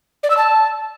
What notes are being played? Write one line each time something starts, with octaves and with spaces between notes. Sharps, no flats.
D5
E6
A5